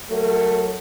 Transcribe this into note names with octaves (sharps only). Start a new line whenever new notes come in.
F#3 A3 A#4